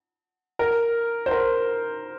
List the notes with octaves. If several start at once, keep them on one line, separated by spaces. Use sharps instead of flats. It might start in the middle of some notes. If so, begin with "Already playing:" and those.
A#4
C5
A#4